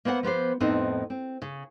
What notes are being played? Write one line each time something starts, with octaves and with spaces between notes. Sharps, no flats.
A#3 B3 C5 D#5 F#5
F3 B3 G4 C5
F2 A2 B3 C4 D#4
C4
C#3